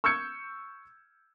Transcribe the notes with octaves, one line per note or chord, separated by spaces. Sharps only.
C#6 E6 F6 G6 G#6 C#7